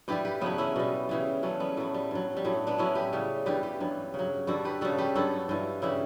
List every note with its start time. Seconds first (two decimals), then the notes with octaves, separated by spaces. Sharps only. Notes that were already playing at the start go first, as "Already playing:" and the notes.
0.08 G2 E3 G3 G4 B4
0.25 G4 B4
0.41 C#3 F#3 B3 D4
0.58 C#4 E4
0.76 B2 G3
1.09 C#3 E3 G3
1.43 C#3 F#3 A3 C#4
1.60 G3 B3
1.77 A2 F#3 A3
1.94 G3
2.11 G2 F#3
2.37 G3
2.45 A2 F#3 A3
2.67 B3 D4
2.78 A2 F#3 C#4 E4
2.95 G4 B4
3.13 C#3 G3
3.46 G2 E3 G3 G4 B4
3.63 G4 B4
3.80 G2 F#3
4.14 C#3 F#3
4.47 G2 D3 G3 F#4 A4
4.65 G4 B4
4.81 C#3 G3 F#4 A4
4.98 G4 B4
5.15 G2 F#3 F#4 A4
5.49 G2 E3 G3
5.82 C#3 E3 G3 E4 G4